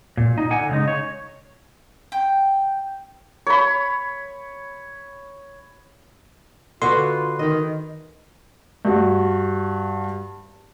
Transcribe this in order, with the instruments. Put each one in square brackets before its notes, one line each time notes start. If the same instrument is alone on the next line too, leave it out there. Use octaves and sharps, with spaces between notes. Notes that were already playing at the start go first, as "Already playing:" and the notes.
[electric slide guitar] A#2
D#4
D3 F#5 G#5
C#3 G#3 D#4
C#5
[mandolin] G5
[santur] C#5 B5
[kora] D3 F#4 B4 [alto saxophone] F4 [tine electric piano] C6
[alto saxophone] D#3 [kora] D#5
[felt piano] G2 F#4